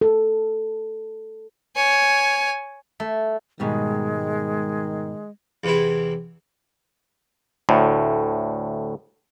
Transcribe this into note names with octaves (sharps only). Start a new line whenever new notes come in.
A4
C#5 G#5
A3
G#2 B2 D#3 G3 G#3
E2 C3 E4
D2 A2